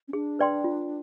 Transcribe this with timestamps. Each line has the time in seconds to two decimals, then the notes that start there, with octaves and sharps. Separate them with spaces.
0.08 C#4
0.13 D4 G#4
0.39 B4 D5 G5 C6
0.64 F4